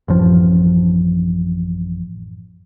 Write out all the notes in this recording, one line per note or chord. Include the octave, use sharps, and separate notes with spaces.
A1 F#2 F3